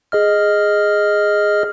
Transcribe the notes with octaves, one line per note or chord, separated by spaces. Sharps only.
G#4 D#5 F6